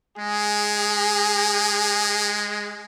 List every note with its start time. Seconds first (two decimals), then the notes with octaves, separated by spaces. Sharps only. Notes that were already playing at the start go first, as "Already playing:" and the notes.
0.19 G#3 G#4